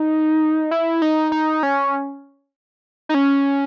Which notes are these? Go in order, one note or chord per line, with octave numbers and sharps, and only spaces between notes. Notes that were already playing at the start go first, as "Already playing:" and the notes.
Already playing: D#4
E4
D#4
D#4
C#4
D#4
C#4